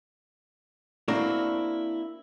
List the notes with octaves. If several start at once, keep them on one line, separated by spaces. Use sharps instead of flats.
A#3 C4 D4 E4 F#4